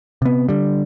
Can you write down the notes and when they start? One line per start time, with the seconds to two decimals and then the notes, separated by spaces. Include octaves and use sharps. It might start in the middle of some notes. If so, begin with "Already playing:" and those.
0.22 C3 B3
0.49 D3 G3